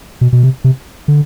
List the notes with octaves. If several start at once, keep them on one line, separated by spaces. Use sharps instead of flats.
B2
B2
C3
C3
D3